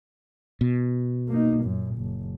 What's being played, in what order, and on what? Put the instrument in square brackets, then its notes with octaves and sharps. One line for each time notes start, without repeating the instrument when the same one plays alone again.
[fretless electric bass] B2
[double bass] A#3 D#4
F#2 A#2
F#1